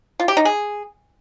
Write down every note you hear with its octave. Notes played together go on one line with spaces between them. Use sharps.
F4
G4
D#4
G#4